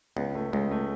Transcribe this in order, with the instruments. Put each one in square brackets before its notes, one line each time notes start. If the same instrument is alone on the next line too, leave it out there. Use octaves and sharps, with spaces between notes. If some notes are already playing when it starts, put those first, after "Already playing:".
[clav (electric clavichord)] C#2 [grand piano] B3
[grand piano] A3
[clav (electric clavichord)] C#2 [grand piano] G#3
[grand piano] A3